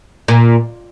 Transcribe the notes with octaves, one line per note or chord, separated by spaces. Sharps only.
A#2